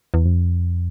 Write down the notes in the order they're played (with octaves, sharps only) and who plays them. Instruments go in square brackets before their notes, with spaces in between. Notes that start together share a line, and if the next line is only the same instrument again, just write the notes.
[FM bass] E2
F2